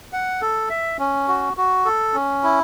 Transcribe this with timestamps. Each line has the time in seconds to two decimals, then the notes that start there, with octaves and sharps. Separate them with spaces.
0.13 F#5
0.41 A4
0.70 E5
0.99 C#4
1.28 F#4
1.57 F#4
1.85 A4
2.14 C#4
2.43 E4